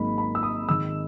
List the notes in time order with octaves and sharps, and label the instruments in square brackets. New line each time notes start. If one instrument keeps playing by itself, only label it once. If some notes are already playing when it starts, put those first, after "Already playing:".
Already playing: [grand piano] G#1 G#2 F#3 A#3 D#4 B5
B5
E6
D#6
G#2 D#3 G#3 E6